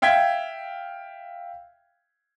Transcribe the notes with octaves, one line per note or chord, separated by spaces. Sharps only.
E5 F5 G5 G#6 B6